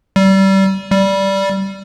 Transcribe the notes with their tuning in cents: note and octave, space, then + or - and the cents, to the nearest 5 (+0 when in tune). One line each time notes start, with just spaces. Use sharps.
G3 -25
G3 -10